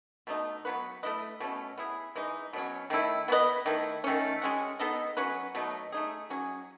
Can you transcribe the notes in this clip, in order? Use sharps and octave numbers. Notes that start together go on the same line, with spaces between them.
B2 A3 D#4
F#3 B3 F#4 B4
A3 E4 B4 D#5
B2 A3 C#4
B3 E4 G#4
E3 G#3 D#4
B2 F#3 C#4
D#3 A3 E4
B3 F#4 B4 D#5
D#3 A3 E4
D#3 A3 C#4
G#3 C#4 F#4
B3 D#4 A4 D#5
F#3 C#4 F#4 B4
B2 F#3 A3 D#4
A3 D#4 G#4
F#3 C#4 G#4